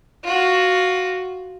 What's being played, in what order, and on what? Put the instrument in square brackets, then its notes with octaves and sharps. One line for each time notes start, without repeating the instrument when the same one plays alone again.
[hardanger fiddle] F4 F#4